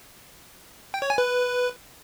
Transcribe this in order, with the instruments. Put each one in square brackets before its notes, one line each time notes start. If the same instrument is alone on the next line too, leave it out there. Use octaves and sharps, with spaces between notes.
[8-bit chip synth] G5
C#5
G#5
B4